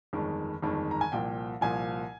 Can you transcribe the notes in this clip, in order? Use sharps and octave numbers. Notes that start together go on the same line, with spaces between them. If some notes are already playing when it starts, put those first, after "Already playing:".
G1 F2 D#3 G#3
G1 F2 D#3 G#3
A#5
G#5
C2 A#2 F3 G5
C2 A#2 F3 G#5